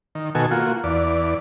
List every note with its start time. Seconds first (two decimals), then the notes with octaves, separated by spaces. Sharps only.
0.15 D#3
0.35 B2 D#3 F#4 A4 G#5
0.51 A#3 F4 F#4
0.84 E2 D5